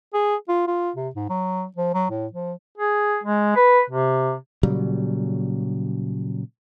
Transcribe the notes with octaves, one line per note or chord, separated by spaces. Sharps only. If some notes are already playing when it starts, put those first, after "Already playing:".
G#4
F4
F4
C3
G#2
F#3
F3
F#3
A2
F3
G#4
G#3
B4
C3
A#2 C#3 F#3 G3